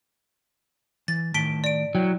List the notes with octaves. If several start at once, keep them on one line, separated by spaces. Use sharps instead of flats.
E3 A6
A2 D#3 A5 B6 D7 G7
D5 D7
F#3 E4 G5